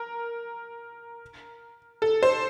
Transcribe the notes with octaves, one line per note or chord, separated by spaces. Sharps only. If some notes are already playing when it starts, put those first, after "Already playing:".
Already playing: A#4
A4
C5